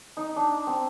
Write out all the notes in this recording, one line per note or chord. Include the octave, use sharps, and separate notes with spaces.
D#4
D4
C4